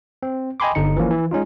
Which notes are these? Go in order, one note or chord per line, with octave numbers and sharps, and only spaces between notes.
C4
D#5 G5 G#5 B5 C6 D6
G1 D3 D#4 C#7
E3 F3 A#3 C#4
E3
G#3 C#4 D#4 F4